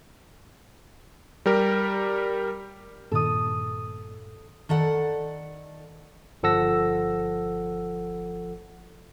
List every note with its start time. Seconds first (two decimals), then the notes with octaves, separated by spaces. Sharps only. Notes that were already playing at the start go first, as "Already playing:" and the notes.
1.46 G3 G4 A#4
3.12 G2 A#2 D#3 A4 D#6
4.69 D#3 A4 D5 F#5
6.43 G1 F3 A4 F#5 E6 A#6